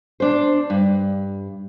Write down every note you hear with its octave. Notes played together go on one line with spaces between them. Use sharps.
D4 C5
G2